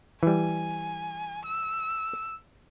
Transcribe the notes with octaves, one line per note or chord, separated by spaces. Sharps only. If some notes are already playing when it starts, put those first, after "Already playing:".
E3 G3 G#5
E6